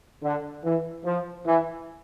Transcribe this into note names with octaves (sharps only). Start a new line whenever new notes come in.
D3
E3
F3
E3